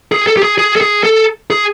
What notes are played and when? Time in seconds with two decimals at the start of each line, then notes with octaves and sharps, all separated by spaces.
0.12 G#4
0.27 A4
0.37 G4
0.43 G#4
0.58 G#4
0.76 A4
0.81 G#4
1.04 A4
1.50 G#4